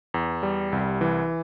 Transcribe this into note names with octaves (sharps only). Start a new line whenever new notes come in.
E2
G3
C2
E3